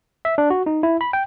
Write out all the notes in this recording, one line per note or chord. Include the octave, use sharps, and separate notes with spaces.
E5
D4
F#4
D#4
E4
B5
G5